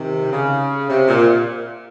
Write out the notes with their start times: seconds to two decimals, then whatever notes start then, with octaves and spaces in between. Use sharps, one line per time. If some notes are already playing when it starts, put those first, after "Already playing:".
Already playing: C3 D#3
0.31 C#3
0.90 C3
1.08 A#2